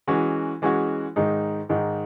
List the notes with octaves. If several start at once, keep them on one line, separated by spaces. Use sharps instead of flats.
E3 G#3 C#4 F#4
E3 G#3 C#4 F#4
G#2 D#3 G#3 D#4
G#2 D#3 G#3 D#4